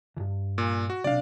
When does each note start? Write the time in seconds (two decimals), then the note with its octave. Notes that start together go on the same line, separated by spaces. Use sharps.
0.17 C#2 G2
0.58 A#2
0.90 F#4
1.04 B1 C3 D4 D5 F5